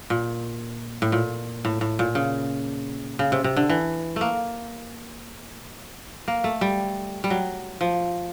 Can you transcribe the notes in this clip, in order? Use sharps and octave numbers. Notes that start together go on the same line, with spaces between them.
A#2
A2
A#2
A2
A2
A#2
C#3
C#3
C3
C3
D3
E3
A3 A#3
A#3
A3
G3
G3
F#3
F3